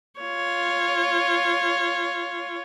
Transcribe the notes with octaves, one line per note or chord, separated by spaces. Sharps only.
F4 C#5